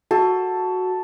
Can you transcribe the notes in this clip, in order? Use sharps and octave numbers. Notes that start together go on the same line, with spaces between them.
F#4 A4